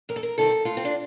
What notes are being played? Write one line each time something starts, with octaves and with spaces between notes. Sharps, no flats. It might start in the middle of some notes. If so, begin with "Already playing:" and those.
F2 A#4
A4
A#4
C3 D#3 G3 C4 A4
A2 F4
C4
D4